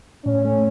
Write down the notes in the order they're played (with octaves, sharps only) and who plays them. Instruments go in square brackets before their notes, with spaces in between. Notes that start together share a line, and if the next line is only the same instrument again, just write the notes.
[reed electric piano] A2 [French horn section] C#4
[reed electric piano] A3